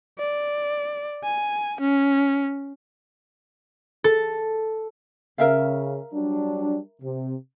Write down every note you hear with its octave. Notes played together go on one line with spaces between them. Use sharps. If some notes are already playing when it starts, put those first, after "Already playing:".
D5
G#5
C#4
A4
C#3 A#4 E5 F5
F#3 G3 D4
C3